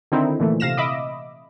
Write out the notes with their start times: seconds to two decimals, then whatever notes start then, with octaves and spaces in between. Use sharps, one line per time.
0.12 D3 D#3 C4 D#4 E4
0.40 A#2 E3 A3
0.60 C3 F5 A#6 E7
0.77 D#5 E5 B5 D6